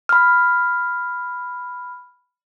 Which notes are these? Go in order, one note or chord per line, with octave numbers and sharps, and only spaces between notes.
B5 F6